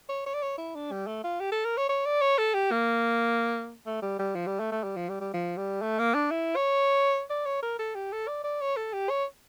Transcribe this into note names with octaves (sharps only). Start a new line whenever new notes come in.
C#5
C#5
D5
C#5
E4
D4
G3
A3
F4
G4
A4
A#4
C#5
C#5
D5
C#5
A4
G4
A#3
A3
G3
G3
F3
G3
A3
A3
G3
F3
G3
G3
F3
G3
A3
A#3
D4
E4
C#5
D5
C#5
A#4
A4
G4
A4
D5
D5
C#5
A4
G4
C#5